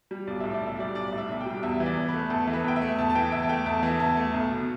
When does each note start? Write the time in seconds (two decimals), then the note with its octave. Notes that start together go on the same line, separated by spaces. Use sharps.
0.11 G3
0.27 B1 D5
0.40 A2 E5
0.54 D5
0.61 B1
0.66 E5
0.79 G3 D5
0.95 B1 D5
1.13 A2
1.18 E5
1.29 B1
1.40 G5
1.46 G3
1.63 E2 E5
1.80 E3
1.86 D5
1.97 E2
2.09 B4
2.14 A3
2.30 E2 A4
2.47 E3
2.53 B4
2.64 E2 G5
2.76 E5
2.82 A3
2.98 E2 A5
3.10 A5
3.15 E3 G5
3.32 E2 E5
3.42 A5
3.49 A3 G5
3.66 E2 A5
3.83 E3
4.00 E2 A5
4.17 A3
4.34 B1
4.51 B2